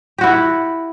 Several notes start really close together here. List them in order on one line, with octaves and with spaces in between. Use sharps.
G4 F#4 E4